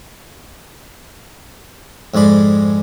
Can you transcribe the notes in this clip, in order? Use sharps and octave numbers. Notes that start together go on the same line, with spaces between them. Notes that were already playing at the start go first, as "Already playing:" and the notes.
F2 G#2 G#3 D5 B5